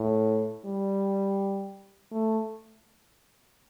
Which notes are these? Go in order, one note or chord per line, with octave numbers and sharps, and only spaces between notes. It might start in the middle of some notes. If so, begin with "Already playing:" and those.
Already playing: A2
G3
A3